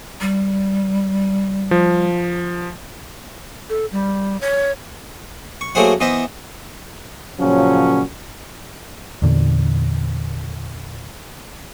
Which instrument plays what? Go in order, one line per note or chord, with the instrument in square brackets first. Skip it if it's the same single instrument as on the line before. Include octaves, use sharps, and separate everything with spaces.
[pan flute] G3
[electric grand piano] F3
[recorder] A4
G3
C#5
[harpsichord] C#6
F#3 A3 A#3 G#4 C5 F#5
E3 B3 C5 D#5 E5
[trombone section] A#2 C#3 F3 F#3 C#4
[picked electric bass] E2 A#2 D3